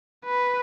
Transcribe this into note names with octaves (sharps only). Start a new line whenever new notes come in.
B4